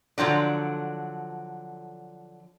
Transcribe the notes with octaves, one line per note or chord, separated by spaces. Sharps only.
D3 F3 F#3 D4